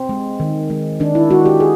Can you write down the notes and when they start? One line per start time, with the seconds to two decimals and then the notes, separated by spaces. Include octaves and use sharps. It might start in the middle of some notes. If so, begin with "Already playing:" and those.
Already playing: C4
0.09 G#3
0.40 D#3
0.70 G#3
1.00 D#3 D4
1.15 E4
1.30 G#3 F#4
1.45 G4
1.60 G#4